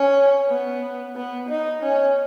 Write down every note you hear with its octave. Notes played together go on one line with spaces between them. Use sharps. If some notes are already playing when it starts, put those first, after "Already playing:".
Already playing: C#4
B3
B3
D#4
C#4